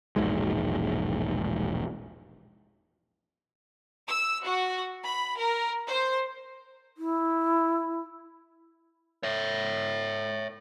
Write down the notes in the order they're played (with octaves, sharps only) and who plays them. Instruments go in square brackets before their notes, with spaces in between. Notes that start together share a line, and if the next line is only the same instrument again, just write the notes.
[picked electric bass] E1 A#1 G#2 G#3
[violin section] E6
F#4
B5
A#4
C5
[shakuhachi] E4
[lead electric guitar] C#5 E5